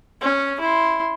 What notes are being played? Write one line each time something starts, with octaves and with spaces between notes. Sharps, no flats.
C#4
E4 C6